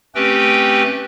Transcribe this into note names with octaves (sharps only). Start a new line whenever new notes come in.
A3 C4 C#4 G4 B4 G5